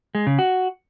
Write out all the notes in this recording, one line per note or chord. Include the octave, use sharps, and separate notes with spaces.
G#3
C#3
F#4